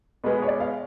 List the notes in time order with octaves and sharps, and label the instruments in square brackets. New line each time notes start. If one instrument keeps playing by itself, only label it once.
[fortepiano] B2 G#3 B3 [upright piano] B4
[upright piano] C#5
D5
F5